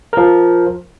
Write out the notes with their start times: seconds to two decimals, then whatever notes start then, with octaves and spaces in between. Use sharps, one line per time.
0.13 F3 A#4